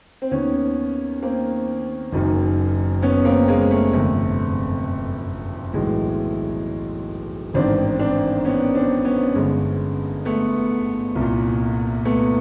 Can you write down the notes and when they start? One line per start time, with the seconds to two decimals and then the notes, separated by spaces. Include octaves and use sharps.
0.22 C4
0.31 D#2 D#3 B3 C#4
1.22 A#3 C4
2.12 F#1 F#2 D#3
3.02 B3 C#4
3.25 A#3 C4
3.48 G#3 A#3
3.71 A3
3.93 G1 F2 C3 A3
5.74 B1 A2 E3 G#3
7.54 A1 G#2 D#3 C4 D4
7.99 C4 D4
8.45 B3 C#4
8.74 C4 D4
9.05 B3 C#4
9.35 G1 G2 D3 G#3
10.25 A3 B3
11.15 C2 A#2
12.05 A3 B3